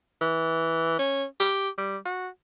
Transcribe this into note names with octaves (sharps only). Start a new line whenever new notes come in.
E3
C#4
G4
G3
F#4